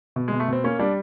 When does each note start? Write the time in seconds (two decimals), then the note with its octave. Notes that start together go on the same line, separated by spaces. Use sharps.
0.16 B2
0.28 G#3
0.32 B2
0.40 A3
0.48 B2 C4
0.64 A#3 C#4
0.79 G3 D4